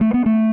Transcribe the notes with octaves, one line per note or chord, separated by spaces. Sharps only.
A3
B3
A3